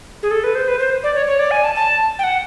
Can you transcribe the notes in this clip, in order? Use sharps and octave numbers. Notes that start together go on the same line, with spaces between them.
G#4
A4
B4
C5
B4
C5
D5
C#5
C#5
D5
G#5
A5
A5
G5
F#5